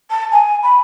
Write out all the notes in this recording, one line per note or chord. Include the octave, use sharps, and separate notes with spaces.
A5
G#5
B5